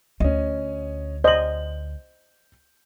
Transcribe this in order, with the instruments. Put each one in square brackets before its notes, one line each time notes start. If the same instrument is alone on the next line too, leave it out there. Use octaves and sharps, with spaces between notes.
[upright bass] D2 [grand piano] C#4 D#5
[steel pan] C5 D5 D#5 [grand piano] G6 F#7